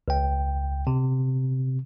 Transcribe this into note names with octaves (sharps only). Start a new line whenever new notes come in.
C#2 G5
C3